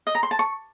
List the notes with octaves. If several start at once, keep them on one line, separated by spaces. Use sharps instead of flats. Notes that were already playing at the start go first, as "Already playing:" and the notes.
D#5
A#5
C6
A5
C#6